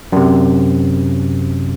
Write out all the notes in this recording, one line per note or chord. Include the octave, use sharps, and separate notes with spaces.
F#2 C3